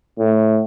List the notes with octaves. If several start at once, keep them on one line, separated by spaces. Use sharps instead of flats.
A2